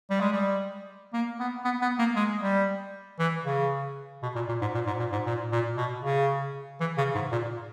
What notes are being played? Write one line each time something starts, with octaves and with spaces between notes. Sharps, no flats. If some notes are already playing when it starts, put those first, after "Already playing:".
G3
G#3
G3
A#3
B3
B3
B3
A#3
G#3
G3
E3
C#3
B2
A#2
A#2
G#2
A#2
G#2
A#2
G#2
A#2
A#2
B2
C#3
E3
C#3
G#2
A#2